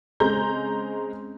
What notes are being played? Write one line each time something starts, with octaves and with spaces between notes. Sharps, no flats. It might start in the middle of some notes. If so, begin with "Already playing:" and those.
C#3 G#3 C4 A#5 G6